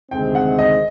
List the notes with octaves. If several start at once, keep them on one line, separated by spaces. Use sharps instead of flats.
D2 C3 D#3 G#3 C4 G5
F#5
D#5